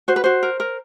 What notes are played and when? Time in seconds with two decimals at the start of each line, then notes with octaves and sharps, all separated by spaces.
0.08 F#4 C5
0.16 B4
0.24 F#4 C5
0.43 A#4
0.60 A#4